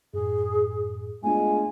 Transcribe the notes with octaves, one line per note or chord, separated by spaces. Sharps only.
F#2 A2 G#4
G#3 A3 B3 D4 F4 G#5